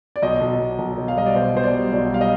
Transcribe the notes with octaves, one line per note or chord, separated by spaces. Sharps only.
D5
B1 D#5
B1
B1
B1
B1
F5
G3 D#5
D5
B2 C5
B2 C5
D5
G3
B1 D5
G3 F5
D#5